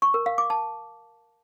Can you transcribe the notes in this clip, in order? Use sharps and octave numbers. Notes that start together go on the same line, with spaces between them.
C#6
A#4
F5
D6
A5